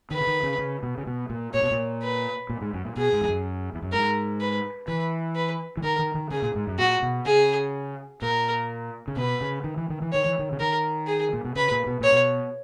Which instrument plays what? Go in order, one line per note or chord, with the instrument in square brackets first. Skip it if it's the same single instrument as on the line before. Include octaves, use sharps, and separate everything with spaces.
[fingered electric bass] D#3 [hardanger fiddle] B4
[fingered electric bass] C#3
D#3
C#3
C#3
B2
C#3
B2
A#2
[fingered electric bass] A#2 [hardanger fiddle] C#5
[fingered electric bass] B2
A#2
[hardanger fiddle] B4
[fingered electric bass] A#2
G#2
F#2
A#2
[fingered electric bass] B2 [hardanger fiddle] G#4
[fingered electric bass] G#2
E2
F#2
E2
F#2
[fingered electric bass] G#2 [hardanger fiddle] A#4
[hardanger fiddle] B4
[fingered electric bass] E3 [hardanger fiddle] B4
[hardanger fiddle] B4
[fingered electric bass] E3
[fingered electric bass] D#3 [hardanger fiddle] A#4
[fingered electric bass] D#3
D#3
[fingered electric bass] C#3 [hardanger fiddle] G#4
[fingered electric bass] A#2
G#2
F#2
[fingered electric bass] A#2 [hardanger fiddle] F#4
[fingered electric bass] B2
[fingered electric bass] C#3 [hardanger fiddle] G#4
[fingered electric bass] A#2 [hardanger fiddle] A#4
[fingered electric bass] C#3
[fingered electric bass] B2 [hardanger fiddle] B4
[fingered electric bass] C#3
D#3
E3
D#3
E3
[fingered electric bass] D#3 [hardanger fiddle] C#5
[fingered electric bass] E3
D#3
C#3
[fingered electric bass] D#3 [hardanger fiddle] A#4
[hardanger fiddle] G#4
[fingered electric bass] A#2
B2
[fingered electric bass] C#3 [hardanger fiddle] B4
[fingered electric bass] A#2
B2
[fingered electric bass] A#2 [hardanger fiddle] C#5
[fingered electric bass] B2